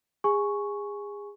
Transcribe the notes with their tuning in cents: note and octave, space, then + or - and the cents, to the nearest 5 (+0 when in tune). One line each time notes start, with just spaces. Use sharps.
G#4 -30 G#5 +10 C#6 +0